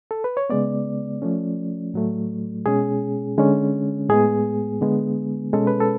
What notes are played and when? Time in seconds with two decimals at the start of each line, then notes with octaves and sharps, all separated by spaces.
0.11 A4
0.24 B4
0.37 C#5
0.50 C#3 G#3 B3 D5
1.22 F3 A3 C#4
1.94 A2 F#3 A3
2.66 B2 G#3 C#4 G#4
3.38 D3 G#3 C#4
4.09 A2 G#3 B3 G#4
4.81 D3 G#3 B3
5.53 B2 G#3 C#4 A4
5.67 B4
5.80 A4